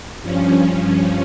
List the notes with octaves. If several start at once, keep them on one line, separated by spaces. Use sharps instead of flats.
G2 F3 C#4